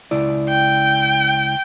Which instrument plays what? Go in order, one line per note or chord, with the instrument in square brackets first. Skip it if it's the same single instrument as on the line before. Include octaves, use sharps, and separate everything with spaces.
[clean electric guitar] C#2 E4 D5
[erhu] G5